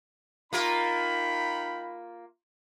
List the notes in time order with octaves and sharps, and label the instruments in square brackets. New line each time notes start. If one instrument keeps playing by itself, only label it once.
[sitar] A#3 F4 A#4 [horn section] D#4 G5 B5